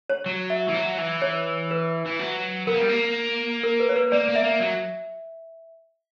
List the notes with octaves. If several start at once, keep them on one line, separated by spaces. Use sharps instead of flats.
C#5
F#3
E5
E3
F#3
E3
C#5
B4
E3
F#3
B3 A#4
A#3
G3
A#3
A#4
B4
C#5
B4
A#3 D5
A#3
E5
A#3
F#3